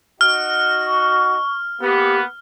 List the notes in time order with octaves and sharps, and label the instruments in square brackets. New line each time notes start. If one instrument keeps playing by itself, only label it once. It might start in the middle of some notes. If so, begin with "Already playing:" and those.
[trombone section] D#4 F#4 [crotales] F6
[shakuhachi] C#6
[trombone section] A#3 B3 [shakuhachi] G4